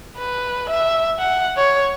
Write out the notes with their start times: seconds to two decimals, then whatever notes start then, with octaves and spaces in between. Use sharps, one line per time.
0.17 B4
0.69 E5
1.19 F#5
1.57 C#5